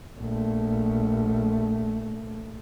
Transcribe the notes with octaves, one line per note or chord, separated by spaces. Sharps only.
A#1 A3